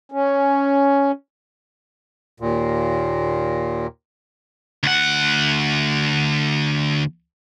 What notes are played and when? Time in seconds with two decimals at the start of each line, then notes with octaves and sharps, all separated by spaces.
0.12 C#4
2.40 D#2 A#2
4.83 D2 F#5